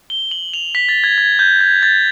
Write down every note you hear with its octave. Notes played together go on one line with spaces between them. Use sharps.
G7
F#7
F7
B6
A6
G#6
G#6
G6
G#6
A6